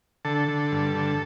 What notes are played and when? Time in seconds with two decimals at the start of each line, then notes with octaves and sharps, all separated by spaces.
0.25 D3 A4
0.48 D3
0.72 G2
0.95 D3